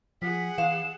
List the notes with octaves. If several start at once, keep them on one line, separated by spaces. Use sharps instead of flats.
F3 G#4 F#5 B6
E2 E3 F5 E7